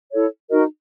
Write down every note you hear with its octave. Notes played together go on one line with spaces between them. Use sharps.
E4 A4 C#5
D#4 F#4 A#4 D#5